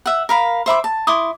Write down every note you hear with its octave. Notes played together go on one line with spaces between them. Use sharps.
E5 F#5
A#4 F5 B5
C5 E5 B5 D6
A5
E4 C6 D6 D#6